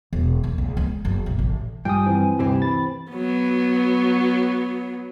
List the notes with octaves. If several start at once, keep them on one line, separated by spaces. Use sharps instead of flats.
E1
E2
C#2
G#3
F#1
B1
A1
G2 F3 G5 G#5 D#6
E3 C4
D2 G2 C3 E3 C4 G4
B5 A6
F#3 B3